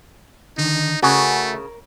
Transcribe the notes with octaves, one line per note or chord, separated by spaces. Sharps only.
D3 D#3 D#4
C#3 A3 F#4 G#4 A#4